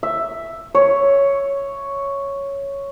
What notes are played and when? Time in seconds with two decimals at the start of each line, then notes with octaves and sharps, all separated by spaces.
0.03 E5
0.75 C#5